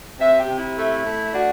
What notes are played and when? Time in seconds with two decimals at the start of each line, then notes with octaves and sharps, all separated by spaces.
0.20 C3 E5
0.39 G4
0.48 C3
0.58 E4
0.77 A3
1.05 A3
1.33 D4 F#4